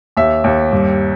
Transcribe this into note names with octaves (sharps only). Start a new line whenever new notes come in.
D#2 E5
D#2
G2